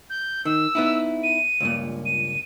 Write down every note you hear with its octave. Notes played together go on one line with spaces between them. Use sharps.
G6
D#3 E6
B3 D#4 E4
D#7
C#2 G2 A#2
D#7